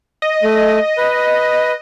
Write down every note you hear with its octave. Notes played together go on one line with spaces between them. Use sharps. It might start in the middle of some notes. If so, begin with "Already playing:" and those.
D#5
A3
B4